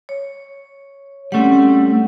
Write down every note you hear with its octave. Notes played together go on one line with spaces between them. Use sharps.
C#5
G3 A3 C4 C#4 F#5